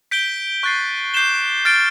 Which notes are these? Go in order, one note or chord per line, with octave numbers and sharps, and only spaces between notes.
G6 B6 D7 G7
C#6 F#6 A6 C7
D6 G6 C7 E7 G7
F6 A6 D7